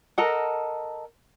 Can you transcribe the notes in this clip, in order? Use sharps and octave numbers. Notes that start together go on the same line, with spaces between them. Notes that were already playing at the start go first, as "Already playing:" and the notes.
A4 A#4 D#5 F#5